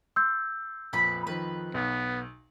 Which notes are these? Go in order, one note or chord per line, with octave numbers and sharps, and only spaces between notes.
C6 E6 G6
A#1 F2 B4 B5
F2 D#3 F3 B4
B1 B3